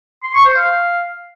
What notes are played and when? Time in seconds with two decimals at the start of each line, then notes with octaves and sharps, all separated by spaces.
0.23 C6
0.34 C#6
0.45 C5
0.56 F5